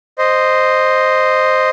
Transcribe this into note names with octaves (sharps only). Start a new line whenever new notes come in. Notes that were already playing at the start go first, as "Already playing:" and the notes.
C5 D#5